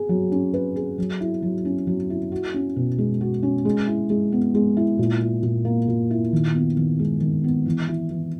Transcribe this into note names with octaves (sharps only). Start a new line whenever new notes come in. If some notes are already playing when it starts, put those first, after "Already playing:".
Already playing: G#4
F#3
C#4
B4
G#4
F#3
E4
F#3
C#4
F#3
E4
F#4
C#4
B2
G#3
F#4
C#4
G#3
E4
G#3
B3
G#3
E4
A#2
E4
A#2
A#3
A#2
E4
D#3
B3
D#3
G#3
D#3
B3
E3
E4
E3